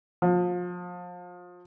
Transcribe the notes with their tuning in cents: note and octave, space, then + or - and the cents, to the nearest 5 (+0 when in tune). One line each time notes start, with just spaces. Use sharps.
F3 +30